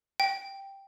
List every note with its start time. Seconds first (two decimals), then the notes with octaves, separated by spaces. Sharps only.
0.20 G5